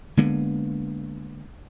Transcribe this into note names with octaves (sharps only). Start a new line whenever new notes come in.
D3 G#3 A#3 B3